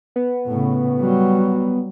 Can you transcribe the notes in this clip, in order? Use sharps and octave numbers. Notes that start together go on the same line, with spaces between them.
B3
A2 C#3
F#3 G3